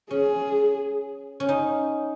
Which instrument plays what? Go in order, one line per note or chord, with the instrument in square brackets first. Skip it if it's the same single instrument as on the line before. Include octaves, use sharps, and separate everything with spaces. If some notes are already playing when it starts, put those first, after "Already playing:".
[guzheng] C#4 [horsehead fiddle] G#4
[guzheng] C#4
D#4